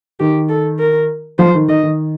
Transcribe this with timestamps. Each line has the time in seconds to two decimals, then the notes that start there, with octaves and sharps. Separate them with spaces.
0.20 D#3 G4
0.49 A4
0.79 A#4
1.39 F3 C5
1.54 D#3
1.68 D#3 D#5
1.83 D#3